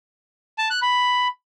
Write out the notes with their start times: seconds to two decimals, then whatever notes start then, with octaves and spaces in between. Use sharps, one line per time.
0.58 A5
0.70 F#6
0.82 B5